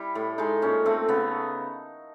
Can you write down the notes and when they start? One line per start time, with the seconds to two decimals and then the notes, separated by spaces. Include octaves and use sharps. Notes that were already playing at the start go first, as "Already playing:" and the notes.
Already playing: G3 E4
0.15 A2
0.38 G#3 D#4
0.62 A#2 C#4
0.86 A3 C4
1.08 C#3 B3